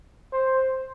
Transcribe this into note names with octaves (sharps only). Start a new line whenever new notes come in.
C5